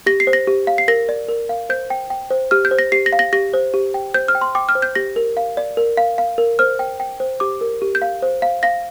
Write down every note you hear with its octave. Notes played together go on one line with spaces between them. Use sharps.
G4 A#6
C7
C5
A#6
G4
F5
C7
A#4 A#6
D5
A#4
F5
C5 G6
G5
G5
C5
G4 F6
G6
C5
A#6
G4 C7
A#6
F5
A#6
G4 A#6
C5
G4
G5
C5 G6
F6
G5
C6
G5 D6
F6
C5
G6
G4 A#6
A#4
F5
D5
A#4
F5
F5
A#4
C5 F6
G5
G5
C5
G4 D6
A#4
G4
G6
F5
C5
F5
F5 A#6